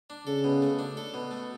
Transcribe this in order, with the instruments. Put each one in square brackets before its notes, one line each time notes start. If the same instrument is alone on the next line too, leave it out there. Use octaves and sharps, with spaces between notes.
[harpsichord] D4
[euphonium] C#3 [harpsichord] A4
[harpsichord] B2
A3
D4
A4
B2
A3